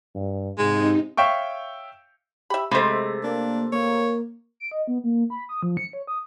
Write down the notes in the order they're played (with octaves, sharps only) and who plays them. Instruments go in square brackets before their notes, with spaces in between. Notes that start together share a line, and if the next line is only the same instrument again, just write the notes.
[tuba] G2
[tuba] G#2 [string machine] C3 D#4 [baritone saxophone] G#3
[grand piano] C#5 E5 F5 G5 C#6
[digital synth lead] G4 [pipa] E5 B5
[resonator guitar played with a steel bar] C3 A3 [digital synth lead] G#3 [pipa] C5 B5
[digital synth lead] A#3 [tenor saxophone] D4
[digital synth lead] A#3 [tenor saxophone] C#5
[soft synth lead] D7
D#5
B3
A#3
B5
D#6
F3
C#7
C#5
D#6